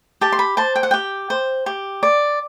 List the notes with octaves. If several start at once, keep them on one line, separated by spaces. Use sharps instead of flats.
G4 A5
C6
B5
C5 A5
G5
F#5
G4 G5
C5
G4
D5